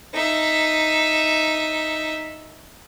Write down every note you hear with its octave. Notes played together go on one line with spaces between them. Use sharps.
D#4 E5